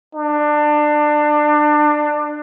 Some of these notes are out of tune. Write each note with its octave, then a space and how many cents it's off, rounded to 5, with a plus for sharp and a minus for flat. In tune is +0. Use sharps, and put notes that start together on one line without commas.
D4 +25